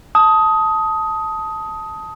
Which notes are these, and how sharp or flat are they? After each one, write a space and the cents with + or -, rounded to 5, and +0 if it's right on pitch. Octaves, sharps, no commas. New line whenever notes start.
A5 +0 D#6 +15